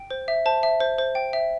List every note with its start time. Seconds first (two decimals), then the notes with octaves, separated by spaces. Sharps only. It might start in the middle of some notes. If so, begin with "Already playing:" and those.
Already playing: G5
0.11 C5
0.28 E5
0.46 C5 A5
0.63 E5
0.80 C5
0.98 C5
1.15 G5
1.33 E5